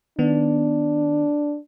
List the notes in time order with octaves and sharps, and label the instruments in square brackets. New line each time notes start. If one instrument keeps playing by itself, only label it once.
[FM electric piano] D#3 B3 [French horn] D4